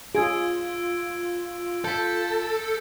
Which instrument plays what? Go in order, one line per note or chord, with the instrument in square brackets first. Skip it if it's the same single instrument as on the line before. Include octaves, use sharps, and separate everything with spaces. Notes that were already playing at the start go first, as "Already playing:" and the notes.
[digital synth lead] F4 [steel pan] G#4 [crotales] E6 G#6 D7
[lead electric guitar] A4 [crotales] G6 B6